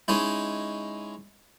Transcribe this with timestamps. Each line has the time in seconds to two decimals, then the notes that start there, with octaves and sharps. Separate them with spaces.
0.08 G#3 C#4 D#4 E4